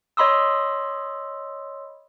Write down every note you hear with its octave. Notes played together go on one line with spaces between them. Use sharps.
C#5 D#5 B5 C6 D#6 E6